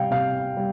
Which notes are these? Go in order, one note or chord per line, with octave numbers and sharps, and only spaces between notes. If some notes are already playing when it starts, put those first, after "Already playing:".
Already playing: C3 G3 F5 G5
C3 F5
G3